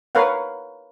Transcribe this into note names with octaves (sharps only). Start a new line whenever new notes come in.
A#4 B4 C#5 F5 F#5